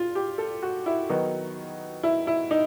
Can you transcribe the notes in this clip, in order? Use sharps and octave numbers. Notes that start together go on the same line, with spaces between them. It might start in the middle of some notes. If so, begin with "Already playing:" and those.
Already playing: F4
G4
A4
F#4
E4
D#3 F#3 B3 D#4
E4
E4
D#4